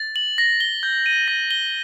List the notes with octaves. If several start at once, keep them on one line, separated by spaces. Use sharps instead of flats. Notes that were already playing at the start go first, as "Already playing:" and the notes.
Already playing: A6
F#7
A#6
G7
G6
D#7
A#6
G7